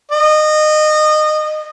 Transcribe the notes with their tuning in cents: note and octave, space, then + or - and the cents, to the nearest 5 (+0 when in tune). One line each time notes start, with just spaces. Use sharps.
D#5 -25